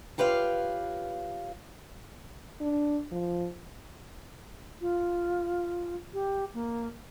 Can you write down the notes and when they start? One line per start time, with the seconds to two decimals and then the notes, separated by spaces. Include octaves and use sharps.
0.18 F4 G4 B4 C#5 F5
2.61 D4
3.11 F3
4.81 F4
6.13 G4
6.54 A#3